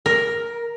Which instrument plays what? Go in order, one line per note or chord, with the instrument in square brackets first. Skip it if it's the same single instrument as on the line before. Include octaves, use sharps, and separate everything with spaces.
[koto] A#4